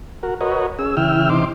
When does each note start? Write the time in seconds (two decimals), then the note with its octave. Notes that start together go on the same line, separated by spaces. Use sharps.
0.23 F#4 A#4
0.41 F#4 A#4 B4 C#5 D#5
0.79 C#4 G#4 E6
0.97 C#3 E3 E4 G5 E6 F6
1.29 C3 E3 D#4 C6 D6